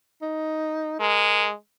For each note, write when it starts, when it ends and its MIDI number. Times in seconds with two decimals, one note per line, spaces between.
0.22 0.97 63
1.00 1.53 56
1.00 1.47 70